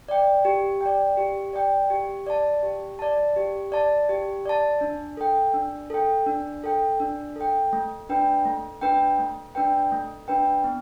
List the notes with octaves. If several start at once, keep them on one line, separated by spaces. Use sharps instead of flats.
D5 G5
G4
D5 G5
G4
D5 G5
G4
D5 A5
G4
D5 A5
G4
D5 A5
G4
D5 A5
D4
A4 G5
D4
A4 G5
D4
A4 G5
D4
A4 G5
A3
D4 B4 G5
A3
D4 B4 G5
A3
D4 B4 G5
A3
D4 B4 G5
B3